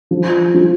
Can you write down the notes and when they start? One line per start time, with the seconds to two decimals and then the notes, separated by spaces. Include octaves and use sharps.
0.11 F3
0.54 F3